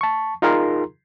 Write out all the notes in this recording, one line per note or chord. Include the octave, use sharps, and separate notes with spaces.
A5 C#6
D#4 F4 G#4 A#4 A#5 C6